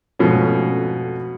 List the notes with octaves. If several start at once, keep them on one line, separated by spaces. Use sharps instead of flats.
F2 G#2 B2 A3 C#4